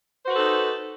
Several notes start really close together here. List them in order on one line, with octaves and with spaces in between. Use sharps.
C5 F#4 B4 A4 D#4